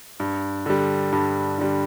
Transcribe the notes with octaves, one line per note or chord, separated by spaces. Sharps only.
G2
D3 G3
G2
D3 G3